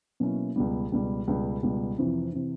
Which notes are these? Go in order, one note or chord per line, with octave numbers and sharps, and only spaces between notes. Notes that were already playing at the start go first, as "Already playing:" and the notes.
B2 F#3 A#3 C#4 E4
C#2 B2 G3
C#2 B2 G3
C#2 B2 G3
C#2 B2 G3
F2 C3 E3
C3 E3